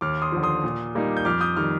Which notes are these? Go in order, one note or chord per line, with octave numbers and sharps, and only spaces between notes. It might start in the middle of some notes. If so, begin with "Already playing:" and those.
D#2 D6 F6
C6 D#6
D3 F3
C6 D#6
A#2
G3 A#3 D#4
G6
F2 D6 F6
D#6 G6
D#3 G3 D6 F6